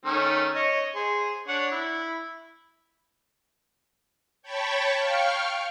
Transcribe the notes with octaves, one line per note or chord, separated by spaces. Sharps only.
D#3 A3 C#4
C#5 D#5
G#4 C5
D4 C#5 F#5
E4
C#5 G5 A5 B5 C#6
F5 G5 C#6 F6